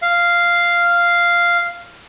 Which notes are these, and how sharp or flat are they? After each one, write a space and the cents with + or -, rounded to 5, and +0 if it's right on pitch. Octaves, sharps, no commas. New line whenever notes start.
F5 -5